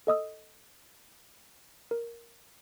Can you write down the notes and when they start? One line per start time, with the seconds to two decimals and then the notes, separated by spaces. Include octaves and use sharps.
0.07 A4 D#5 D#6 E6
1.91 A#4